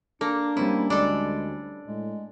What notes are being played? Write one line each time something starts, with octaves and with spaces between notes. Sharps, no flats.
A#3 D4 A4
G3 A#3 C4 C#4 E4
D2 G#3 D4 A4
A2 G#3